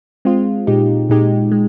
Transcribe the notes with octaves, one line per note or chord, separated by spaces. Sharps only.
G#3 C4 F4
A#2 G#3 D#4 G4
A#2 G#3 D#4 G4
G#3